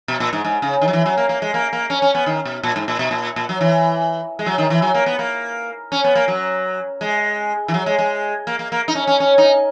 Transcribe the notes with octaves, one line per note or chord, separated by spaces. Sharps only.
B2
A#2
G#2
G#2
C#3
D#3
F#3
E3
F#3
A#3
A#3
G#3
A#3
A#3
C#4
C#4
B3
D#3
B2
A#2
G#2
A#2
B2
A#2
A#2
F#3
E3
G#3
F#3
D#3
E3
F#3
A#3
B3
A#3
C#4
B3
A#3
F#3
G#3
E3
F#3
G#3
G#3
A#3
A#3
A#3
D#4
C#4
C#4
C#4
D#4